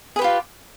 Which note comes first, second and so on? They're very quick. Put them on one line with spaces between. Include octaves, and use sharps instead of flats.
G#4 B4 G4 F4